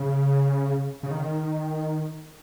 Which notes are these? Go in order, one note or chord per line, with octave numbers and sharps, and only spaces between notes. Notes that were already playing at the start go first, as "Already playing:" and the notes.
Already playing: C#3
C#3
D#3